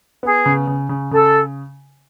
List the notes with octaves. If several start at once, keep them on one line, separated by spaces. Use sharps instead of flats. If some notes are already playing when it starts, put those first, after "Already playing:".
B3 G#4
C#3
C#3
C#3
C#3 A4